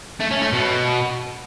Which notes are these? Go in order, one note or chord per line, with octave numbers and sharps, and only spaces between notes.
A3
C#4
A3
B2